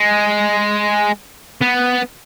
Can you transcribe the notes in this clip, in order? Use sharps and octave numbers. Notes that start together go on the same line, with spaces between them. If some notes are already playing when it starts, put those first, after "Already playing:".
Already playing: G#3
B3